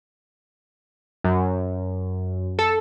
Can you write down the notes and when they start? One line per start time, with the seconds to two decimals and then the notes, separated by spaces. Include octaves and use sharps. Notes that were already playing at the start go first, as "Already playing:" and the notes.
1.24 F#2
2.59 A4